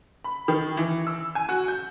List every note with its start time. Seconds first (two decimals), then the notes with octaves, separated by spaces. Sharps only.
0.24 B5
0.48 D#3
0.77 E3
1.07 E6
1.35 G#5
1.49 F#4
1.68 G6